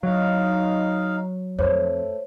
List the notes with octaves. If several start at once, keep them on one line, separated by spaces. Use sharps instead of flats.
F#3 D#4 F5
F2 A3 C5 C#5